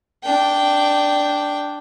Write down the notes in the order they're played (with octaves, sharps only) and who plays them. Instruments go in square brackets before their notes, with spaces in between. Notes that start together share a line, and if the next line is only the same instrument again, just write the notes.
[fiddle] D4 G5